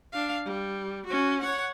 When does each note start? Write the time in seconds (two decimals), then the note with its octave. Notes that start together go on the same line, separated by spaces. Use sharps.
0.12 D4 F5
0.45 G3
1.06 C#4 F#4
1.41 C#5 F#5